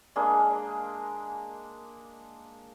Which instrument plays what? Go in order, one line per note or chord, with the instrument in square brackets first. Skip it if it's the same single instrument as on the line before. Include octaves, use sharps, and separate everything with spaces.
[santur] G#3 A#3 D4